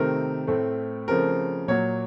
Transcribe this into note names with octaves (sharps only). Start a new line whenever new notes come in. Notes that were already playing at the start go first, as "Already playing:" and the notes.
Already playing: C3 D#3 A3 C4 A#4
A2 A3 C4
C#3 F3 A3 C4 A#4
A#2 F#3 A#3 C#5